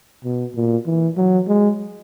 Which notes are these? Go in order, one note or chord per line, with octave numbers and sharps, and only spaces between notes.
B2
A#2
E3
F#3
G#3